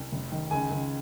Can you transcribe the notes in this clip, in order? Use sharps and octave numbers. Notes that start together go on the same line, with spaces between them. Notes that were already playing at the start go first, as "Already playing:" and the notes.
Already playing: C2
F1
D#3
C#2 G#5
C#2